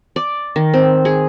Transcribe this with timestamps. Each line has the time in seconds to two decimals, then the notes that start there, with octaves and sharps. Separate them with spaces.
0.16 D5
0.56 D#3
0.74 C4
1.05 G#4